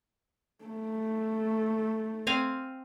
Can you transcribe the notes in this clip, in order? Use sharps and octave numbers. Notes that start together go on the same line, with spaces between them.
A3
C4 F5 G#5